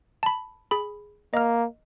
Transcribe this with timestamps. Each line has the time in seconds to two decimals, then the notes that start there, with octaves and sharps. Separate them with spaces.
0.23 A5 B5
0.71 G#4 B5
1.34 A#3 D#5 F6